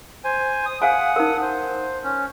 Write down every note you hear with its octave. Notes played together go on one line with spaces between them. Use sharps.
C5 G#5
D#6
F5 F#5 G#5 D#6
D#4 A#4
C5
C#4